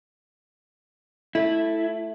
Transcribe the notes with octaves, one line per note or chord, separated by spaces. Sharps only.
A3 E4